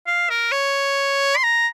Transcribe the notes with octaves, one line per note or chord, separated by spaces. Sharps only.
F5
A#4
C#5
C6
A#5